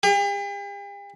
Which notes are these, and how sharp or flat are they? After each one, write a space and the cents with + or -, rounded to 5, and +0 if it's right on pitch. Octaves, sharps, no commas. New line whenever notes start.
G4 +45